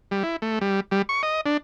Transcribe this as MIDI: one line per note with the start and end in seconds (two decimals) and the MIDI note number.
0.11 0.23 55
0.23 0.36 64
0.42 0.59 57
0.61 0.80 55
0.91 1.02 55
1.09 1.22 85
1.23 1.41 75
1.46 1.57 62